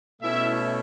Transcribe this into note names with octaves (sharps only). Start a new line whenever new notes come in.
B2 A3 C#4 E4 E5